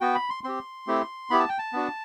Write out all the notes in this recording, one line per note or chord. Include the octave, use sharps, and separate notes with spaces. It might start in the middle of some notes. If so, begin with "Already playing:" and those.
B3 F#4 G5
B5
C6
C4 G4 C6
A3 C4 E4 G4
B3 E4 G4 B5
A5
G5
A5
B3 D4 F#4